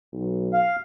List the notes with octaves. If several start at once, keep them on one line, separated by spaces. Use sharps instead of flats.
B1
F5